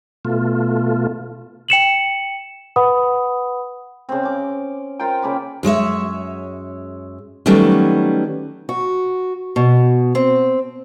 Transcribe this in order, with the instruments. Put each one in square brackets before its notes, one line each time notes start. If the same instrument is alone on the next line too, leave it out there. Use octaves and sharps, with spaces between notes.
[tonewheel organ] B2 A3 F4
[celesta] G5 C#7 E7 F#7
B4 F#5 B5 D#6
[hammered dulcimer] C#3 C4
C#4 D6
[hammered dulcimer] F4 A#4 C5 [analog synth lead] G5
[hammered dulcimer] C#3 A#3 B5
[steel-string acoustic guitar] F#2 G#3 C#5 E5
D#3 F#3 G3 A3 B3 C#4
F#4
B2
C4